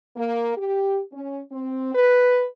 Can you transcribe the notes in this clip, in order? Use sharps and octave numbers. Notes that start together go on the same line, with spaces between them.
A#3
G4
C#4
C4
B4